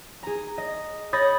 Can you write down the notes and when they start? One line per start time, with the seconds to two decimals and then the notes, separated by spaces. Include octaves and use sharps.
0.23 G#4 A#5
0.58 D#5
1.13 C#5 B5 D#6 G6 A6 A#6